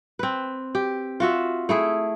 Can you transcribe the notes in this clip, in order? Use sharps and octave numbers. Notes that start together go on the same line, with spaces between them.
C4 B4
G4
F4 F#4 E5
A3 E4 G#4